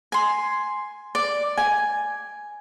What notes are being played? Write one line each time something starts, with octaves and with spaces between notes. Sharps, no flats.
G#5 C6
D5
G#5